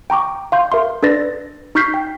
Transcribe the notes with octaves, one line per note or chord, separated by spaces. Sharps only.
G5 A#5 C#6 D6
F5 C6 G6
A#4 E5 C6
D4 A4 B4 D5 A6 A#6
D#4 C#6 F6 G6 B6 C7
G5